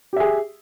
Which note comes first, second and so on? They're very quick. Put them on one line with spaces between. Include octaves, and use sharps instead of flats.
G4 E5 G#4